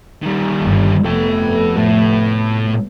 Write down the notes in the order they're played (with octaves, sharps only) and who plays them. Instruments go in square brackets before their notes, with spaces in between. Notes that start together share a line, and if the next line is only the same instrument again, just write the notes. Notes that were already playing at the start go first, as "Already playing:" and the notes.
[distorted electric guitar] D#3 G3
[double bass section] G1 G2
[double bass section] F1 A3 B3 [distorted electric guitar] A4 G5
[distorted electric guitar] A2